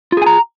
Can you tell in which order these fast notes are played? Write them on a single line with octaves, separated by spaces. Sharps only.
F4 G#4 G#5 A#5